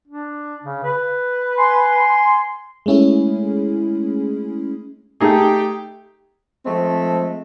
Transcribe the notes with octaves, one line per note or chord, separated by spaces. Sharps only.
D4
C#3
B4
G#5 C6
G#3 A3 C#4 E4 G#4
A3 D#4 G4 G#4
F3 G#3 A3 C4